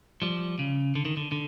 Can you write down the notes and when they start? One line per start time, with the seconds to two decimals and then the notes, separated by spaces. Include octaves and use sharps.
0.22 F3 G3
0.59 C#3
0.95 D3
1.05 D#3
1.17 D3
1.32 D3